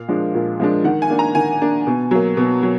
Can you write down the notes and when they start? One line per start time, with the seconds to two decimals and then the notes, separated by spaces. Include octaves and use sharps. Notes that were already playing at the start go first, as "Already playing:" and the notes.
Already playing: A#2 F5
0.08 F3 G#3 D4
0.35 A#2
0.60 F3 G#3 D4
0.84 D#3 F#5
1.02 G#5
1.10 A#3 D4
1.19 A#5
1.35 D#3 G#5
1.61 A#3 D4
1.87 B2
2.11 F#3 A#3
2.37 B2
2.63 F#3